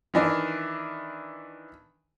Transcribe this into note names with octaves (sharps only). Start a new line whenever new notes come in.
D#3 E3 D4